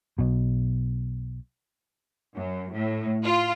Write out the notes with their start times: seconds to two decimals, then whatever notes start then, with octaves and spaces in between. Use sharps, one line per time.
0.19 B1 B2
2.35 F#2
2.74 A2
3.24 F4